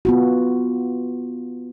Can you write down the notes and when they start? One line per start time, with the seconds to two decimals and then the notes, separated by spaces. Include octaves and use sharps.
0.05 B3 F4 F#4